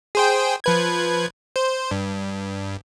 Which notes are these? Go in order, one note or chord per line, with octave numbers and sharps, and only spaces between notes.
G#4 C5 G5
F3 B4 G#6
C5
G2